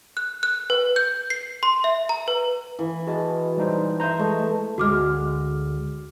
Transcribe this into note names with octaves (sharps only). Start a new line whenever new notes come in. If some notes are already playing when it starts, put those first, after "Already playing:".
F#6
F#6
B4
G6
C7
C6
E5
A#5
B4
E3
F#4 G#4 D#5 A5
G3 D#4 C5
C5 E5 A#5 G6
G#3 A3 D#5
D2 G#3 F#4 D6 F6